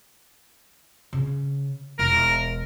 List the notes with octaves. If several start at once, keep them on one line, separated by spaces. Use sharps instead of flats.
C#3
E1 A#4